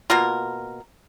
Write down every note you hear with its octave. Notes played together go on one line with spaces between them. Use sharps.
B2 A#3 F4 A#4